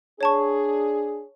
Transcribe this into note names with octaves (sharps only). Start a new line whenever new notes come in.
D4 G#4 C#5 A5 C#6